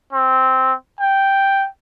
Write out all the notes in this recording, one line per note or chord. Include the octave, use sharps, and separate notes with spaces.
C4
G5